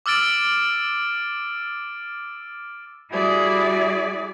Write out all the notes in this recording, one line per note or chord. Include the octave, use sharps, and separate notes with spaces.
D6 E6 F6 A6 D7
G3 E4 F#4 G#4 D5 E5